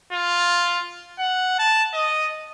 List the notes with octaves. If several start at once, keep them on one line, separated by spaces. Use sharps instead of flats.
F4
F#5
A5
D#5